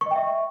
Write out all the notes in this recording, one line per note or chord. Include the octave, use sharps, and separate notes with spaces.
D#5 E5 G5 C#6